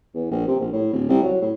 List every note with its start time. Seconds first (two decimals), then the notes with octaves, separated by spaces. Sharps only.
0.14 E2
0.31 A#1
0.48 C3
0.60 A#1
0.73 A2
0.93 D1
1.08 C2
1.23 F#3
1.41 A2